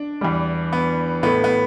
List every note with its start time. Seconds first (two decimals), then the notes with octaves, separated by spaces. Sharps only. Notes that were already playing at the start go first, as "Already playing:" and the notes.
Already playing: D4
0.21 E2 E3 G3
0.73 B3
1.23 A2 A3 B3
1.44 B3